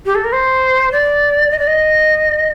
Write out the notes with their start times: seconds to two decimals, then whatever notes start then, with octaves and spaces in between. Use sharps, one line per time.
0.05 G4
0.15 A4
0.24 A#4
0.32 C5
0.91 D5
1.50 D#5
1.58 D5
1.67 D#5